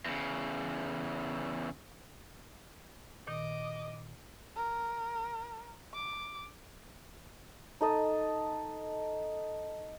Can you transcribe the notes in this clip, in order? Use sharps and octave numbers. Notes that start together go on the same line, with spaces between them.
E2 C#3
A#2 D#3 D#5 D6
A#4
D6
D#4 A4 D#5